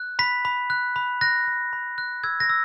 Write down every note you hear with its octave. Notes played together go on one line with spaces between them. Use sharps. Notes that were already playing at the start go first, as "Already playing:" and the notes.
Already playing: F#6
B5 B6
B5
F#6
B5
F#6 A#6
F#6
B5
F#6
E6 G#6
A#6
E6